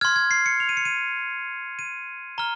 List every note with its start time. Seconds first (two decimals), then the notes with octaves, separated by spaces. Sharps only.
0.01 C6 F6 G#6
0.16 G#6
0.31 C7
0.46 C#7
0.60 F7
0.69 D#7
0.77 C#7
0.85 D#7
1.79 D#7
2.38 A#5 F6 G7